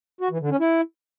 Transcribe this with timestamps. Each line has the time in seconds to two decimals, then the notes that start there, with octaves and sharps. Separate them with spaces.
0.21 F#4
0.31 E3
0.40 D3
0.50 C#4
0.60 E4